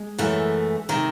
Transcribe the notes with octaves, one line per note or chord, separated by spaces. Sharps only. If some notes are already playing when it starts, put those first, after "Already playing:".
Already playing: G#3
F#2 E3 A3
C3 D#3